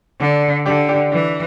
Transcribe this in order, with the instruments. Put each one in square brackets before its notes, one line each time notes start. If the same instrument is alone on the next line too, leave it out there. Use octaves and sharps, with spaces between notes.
[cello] D3 [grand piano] D4
[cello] D3 [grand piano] D4 G4
[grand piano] D4 G4
[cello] E3 [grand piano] D4